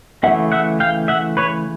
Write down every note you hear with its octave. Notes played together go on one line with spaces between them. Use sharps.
C#3 E3 A3 E5 F#5
E5 F#5
F5 G5
E5 F#5
B4 C#5